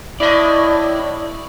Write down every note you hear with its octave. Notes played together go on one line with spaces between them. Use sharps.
A2 E4 D5 D#5